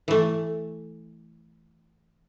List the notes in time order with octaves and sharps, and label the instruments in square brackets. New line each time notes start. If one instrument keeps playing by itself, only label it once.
[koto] E3 A3